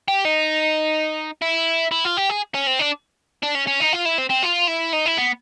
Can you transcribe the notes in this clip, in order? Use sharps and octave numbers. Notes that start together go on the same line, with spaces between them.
G4
D#4
E4
E4
F4
G4
G#4
C#4
C4
D4
D4
C#4
C#4
D#4
F4
E4
C4
C4
F4
E4
D#4
E4
B3